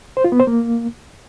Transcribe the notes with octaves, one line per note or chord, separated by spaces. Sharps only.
C5
F4
B3
C5
A#3